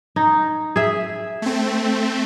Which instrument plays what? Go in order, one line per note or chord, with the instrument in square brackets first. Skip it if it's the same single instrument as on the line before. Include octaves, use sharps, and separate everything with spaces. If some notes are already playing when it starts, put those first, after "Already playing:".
[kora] D#4
G#4 E5
[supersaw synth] A3 C4